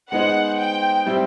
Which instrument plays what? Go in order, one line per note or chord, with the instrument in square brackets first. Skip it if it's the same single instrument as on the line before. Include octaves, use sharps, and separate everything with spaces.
[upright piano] G#3 B3 D#4 G#4 C5 [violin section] F#5
[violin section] G5
[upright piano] G3 C4 E4